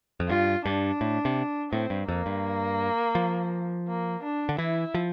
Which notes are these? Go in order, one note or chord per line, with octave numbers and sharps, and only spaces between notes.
F2
G2 F4
G2 D4
A2
C3
A2 C4
G2
F2 A#3
G2
F3
A#3
D4
D3
E3 E4
F3